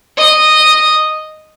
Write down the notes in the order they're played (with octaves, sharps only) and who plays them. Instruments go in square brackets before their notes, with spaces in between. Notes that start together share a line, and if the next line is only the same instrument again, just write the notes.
[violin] D#5